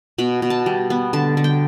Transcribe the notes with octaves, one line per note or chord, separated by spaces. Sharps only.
B2 B5
B2
A5
G3
B3
D3 A5
D3
G5